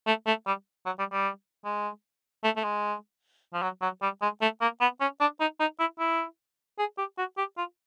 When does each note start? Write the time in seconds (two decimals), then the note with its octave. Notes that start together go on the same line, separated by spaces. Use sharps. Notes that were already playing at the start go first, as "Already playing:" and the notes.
0.07 A3
0.27 A3
0.47 G3
0.86 F#3
0.99 G3
1.12 G3
1.65 G#3
2.44 A3
2.57 A3
2.64 G#3
3.54 F3
3.63 F#3
3.82 F#3
4.02 G3
4.22 G#3
4.42 A3
4.61 A#3
4.81 B3
5.01 C#4
5.20 D4
5.41 D#4
5.60 D#4
5.80 E4
5.99 E4
6.79 G#4
6.98 G4
7.18 F#4
7.38 G4
7.58 F4